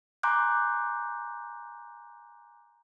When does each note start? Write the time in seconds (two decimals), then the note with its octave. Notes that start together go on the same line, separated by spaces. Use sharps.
0.23 G#5 A#5 C6 D6 F#6 G6